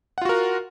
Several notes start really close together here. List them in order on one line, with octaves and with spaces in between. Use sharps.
F#5 F4 F#4 A#4